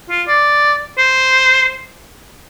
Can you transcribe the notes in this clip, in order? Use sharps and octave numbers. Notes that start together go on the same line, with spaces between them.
F4
D5
C5